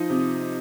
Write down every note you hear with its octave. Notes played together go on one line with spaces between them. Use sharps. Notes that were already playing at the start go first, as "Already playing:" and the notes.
Already playing: F3 D#4
C3